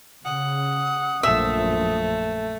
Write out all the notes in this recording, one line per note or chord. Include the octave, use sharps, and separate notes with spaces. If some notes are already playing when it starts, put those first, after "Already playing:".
C#3 F#5 D#6
A#1 F#2 F3 A3 E5